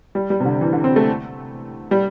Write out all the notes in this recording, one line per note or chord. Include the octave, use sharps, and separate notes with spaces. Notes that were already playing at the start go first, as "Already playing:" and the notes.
G3
G3
C3
D3
E3
D3
C4
A3
G3